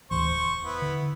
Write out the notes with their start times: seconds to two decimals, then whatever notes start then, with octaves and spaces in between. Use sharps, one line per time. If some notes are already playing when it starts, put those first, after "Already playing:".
0.11 D2 A2 E3 C5 C#6
0.29 E1
0.63 B3 E4
0.82 D3